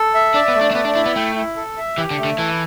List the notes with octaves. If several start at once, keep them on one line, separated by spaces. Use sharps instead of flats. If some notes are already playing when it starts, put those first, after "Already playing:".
Already playing: A4
E5
D4 D5
B3
A3
D4
D4
B3 D5
D4
D4 E4
B3
A3 G5
E4
A4
E5
E3 G4
D3
A3
D3
E3 A4